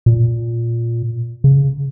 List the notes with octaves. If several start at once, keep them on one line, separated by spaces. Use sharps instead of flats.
A#2
C#3